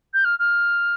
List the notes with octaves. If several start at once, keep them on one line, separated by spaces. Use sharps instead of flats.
G6
F6
F6